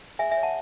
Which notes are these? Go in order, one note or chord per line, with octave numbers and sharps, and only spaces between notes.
G#4 E5 G#5
E5 G#5
C#5
F#5 A5